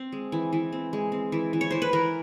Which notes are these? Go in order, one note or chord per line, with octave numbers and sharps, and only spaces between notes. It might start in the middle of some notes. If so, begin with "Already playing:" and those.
Already playing: C4
G#3
E3
E3
C4
G#3
C4
E3
E3
C#5
E3 C5
B4
E3 A#4